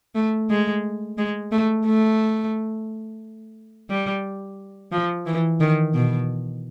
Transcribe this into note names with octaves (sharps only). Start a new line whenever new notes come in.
A3
G#3
G#3
A3
A3
G3
F3
E3
D#3
B2